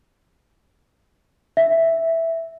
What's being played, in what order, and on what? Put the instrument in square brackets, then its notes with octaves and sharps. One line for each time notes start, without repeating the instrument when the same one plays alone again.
[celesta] E5